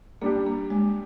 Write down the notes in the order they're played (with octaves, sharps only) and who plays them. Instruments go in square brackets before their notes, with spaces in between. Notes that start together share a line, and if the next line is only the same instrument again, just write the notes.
[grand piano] G3 D4 G4 [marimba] A#3
[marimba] A#3
G#3